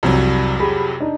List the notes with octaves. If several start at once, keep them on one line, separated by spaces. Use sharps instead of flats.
C2 F2 C3 F#3
G4 G#4 B5
D4 D#4